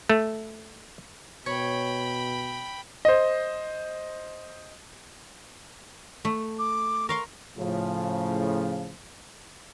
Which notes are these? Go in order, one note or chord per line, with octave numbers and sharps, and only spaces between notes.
A3
B2 C#5 G5 B5
C5 D#5
A3
D6
A#4 F5 C6 C#6
A2 C#3 F3